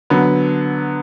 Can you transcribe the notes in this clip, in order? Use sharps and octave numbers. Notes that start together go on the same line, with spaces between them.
D3 F#3 B3